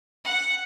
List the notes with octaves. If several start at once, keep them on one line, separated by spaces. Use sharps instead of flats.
F#5